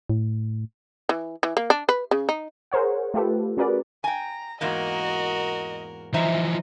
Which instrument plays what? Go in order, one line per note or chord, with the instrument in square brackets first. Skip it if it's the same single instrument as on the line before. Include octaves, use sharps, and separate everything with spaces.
[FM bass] A2
[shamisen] E3
E3
A#3
D4
B4
C#3
D#4
[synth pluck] G#4 A#4 C5 C#5 F#5
A3 F4 G4 A4 B4
C#4 F#4 G#4 A#4 B4 D5
[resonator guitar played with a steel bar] G5 G#5 [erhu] A#5
[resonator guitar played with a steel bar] E2 G#2 A#3 [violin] F#4 A#4 [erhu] D#5
[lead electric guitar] E3 F3 [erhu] D#4 [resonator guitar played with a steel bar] C5 E5 A#5